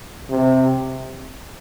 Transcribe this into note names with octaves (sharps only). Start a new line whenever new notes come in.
C3